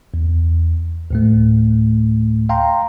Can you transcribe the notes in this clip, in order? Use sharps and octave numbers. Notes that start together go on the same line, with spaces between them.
E2
D2 A2 A3
F5 G5 A#5 C6